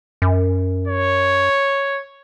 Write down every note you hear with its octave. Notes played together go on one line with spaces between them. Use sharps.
F#2
C#5